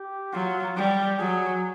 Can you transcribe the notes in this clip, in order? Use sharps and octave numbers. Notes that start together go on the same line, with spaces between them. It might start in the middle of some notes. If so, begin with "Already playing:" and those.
Already playing: G4
F#3 F4
G3 G4
F#3 G#4